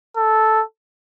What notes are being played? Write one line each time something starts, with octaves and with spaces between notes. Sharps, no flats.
A4